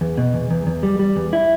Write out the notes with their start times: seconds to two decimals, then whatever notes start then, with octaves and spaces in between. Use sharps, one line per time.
0.01 E2
0.18 B2
0.34 E2
0.51 E2
0.67 E2
0.83 G3
0.99 G3
1.16 E2
1.33 E4